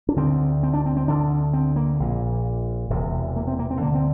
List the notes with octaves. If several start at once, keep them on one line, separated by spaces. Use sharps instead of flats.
D4
D2 D3 C4
C4
D4
C4
C4
D2 D3 D4
C4
A#3
A#1 A#2
E1 E2 C3
A#3
C4
A#3
C4
D2 D3 A#3
C4